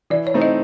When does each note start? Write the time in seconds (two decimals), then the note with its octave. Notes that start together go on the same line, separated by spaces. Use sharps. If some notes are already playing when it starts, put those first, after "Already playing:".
0.10 E3 D5
0.27 C#5
0.34 A3 C4 D#4
0.42 D#5